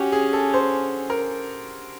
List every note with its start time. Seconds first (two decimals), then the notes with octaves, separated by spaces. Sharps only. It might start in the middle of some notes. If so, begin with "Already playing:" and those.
Already playing: C#4 F#4 G4
0.12 G#4
0.33 A4
0.54 C5
1.10 A#4